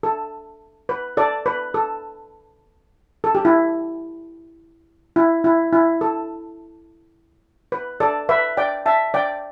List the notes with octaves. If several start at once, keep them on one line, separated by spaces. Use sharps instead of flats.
A4
B4
A4 D5
B4
A4
A4
G4
E4
E4
E4
E4
A4
B4
A4 D5
B4 E5
D5 G5
E5 A5
D5 G5